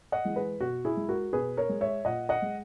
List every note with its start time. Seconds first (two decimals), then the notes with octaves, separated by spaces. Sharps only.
0.12 D#5 F#5
0.25 E3 G#3
0.36 G#4 B4
0.61 B2 F#4
0.85 E4 G#4
0.97 G#3
1.09 F#4 A#4
1.33 B2 G#4 B4
1.57 A#4 C#5
1.69 G#3
1.81 C#5 E5
2.05 A#2 D#5 F#5
2.29 D#5 F#5
2.42 G#3